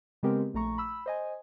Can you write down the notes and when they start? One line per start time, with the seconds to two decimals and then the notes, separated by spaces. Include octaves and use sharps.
0.23 C#3 G#3 B3 C4 G4 A#4
0.54 A#1 A3 A#5 C#6
0.78 B5 E6
1.06 C5 D#5 G#5